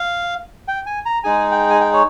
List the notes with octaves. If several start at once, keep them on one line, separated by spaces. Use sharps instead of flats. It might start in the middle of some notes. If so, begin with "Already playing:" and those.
Already playing: F5
G5
G#5
A#5
G#3 D#4 G#4 G#5
G5
G#5
G5
C#5